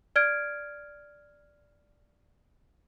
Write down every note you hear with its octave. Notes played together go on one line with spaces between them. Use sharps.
D5 F6 G#6 D7